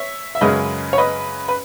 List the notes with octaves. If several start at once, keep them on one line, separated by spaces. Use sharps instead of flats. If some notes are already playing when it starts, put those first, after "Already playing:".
Already playing: C#5 E5
E5
F#2 C#3 G#3 C#4 B4 D#5
C#5
B4 D#5
B4